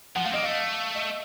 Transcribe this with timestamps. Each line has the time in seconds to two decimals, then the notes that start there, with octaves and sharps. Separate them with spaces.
0.16 F3 F#5
0.25 A3 F5
0.31 C4
0.34 A#3 D#5
0.43 A3 F5
0.95 D#5